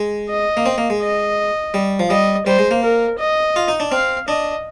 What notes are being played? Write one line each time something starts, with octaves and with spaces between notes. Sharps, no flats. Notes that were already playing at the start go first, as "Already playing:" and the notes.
Already playing: G#3
D#5
A#3
C4
A#3
G#3
D#5
G3
F3
G3 D#5
G3 C5
G#3
A#3
A#4
D#5
F4
D#4
D4
C4 F5
D4 D#5